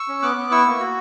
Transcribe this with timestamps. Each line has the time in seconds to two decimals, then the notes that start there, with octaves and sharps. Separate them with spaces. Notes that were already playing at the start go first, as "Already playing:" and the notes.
Already playing: C#6 E6
0.08 C#4
0.22 B3 D6 F#6
0.37 B3
0.51 E4 C#6 E6
0.66 A#3
0.80 F#4